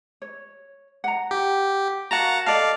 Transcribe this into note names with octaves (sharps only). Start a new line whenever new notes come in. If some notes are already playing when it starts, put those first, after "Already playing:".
C#5
F#5 A#5
G4
F#4 A#4 F5 F#5 A5 A#5
A4 D5 D#5 F5 A5